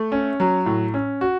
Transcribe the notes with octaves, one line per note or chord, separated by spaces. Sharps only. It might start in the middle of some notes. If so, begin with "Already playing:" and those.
Already playing: A3
C#4
F#3
A2
C#4
F#4